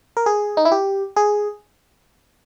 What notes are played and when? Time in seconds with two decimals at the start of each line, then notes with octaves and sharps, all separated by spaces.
0.17 A#4
0.26 G#4
0.57 D#4
0.65 E4
0.72 G4
1.16 G#4